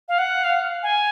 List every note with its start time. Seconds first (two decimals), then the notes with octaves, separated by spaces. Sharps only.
0.09 F5
0.18 F#5
0.44 F5
0.83 G#5